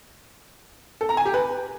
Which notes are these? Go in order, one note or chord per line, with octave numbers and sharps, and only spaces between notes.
A4
A#5
G#5
G4
B4